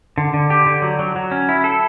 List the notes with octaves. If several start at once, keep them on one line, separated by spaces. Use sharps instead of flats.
D3
D3
G4
D3
F#3
F#3
F#3
C#4
E4
A4